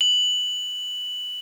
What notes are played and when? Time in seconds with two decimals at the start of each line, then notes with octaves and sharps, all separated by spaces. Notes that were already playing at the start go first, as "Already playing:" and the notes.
0.01 F#7